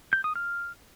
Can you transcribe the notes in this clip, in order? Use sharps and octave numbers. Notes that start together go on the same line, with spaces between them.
G6
D#6
F6